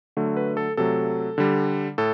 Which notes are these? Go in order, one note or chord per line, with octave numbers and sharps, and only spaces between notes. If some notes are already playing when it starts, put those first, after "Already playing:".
D3 F#3 A3
B4
A4
C3 F#3 A3 A4
D3 G3
A2 A4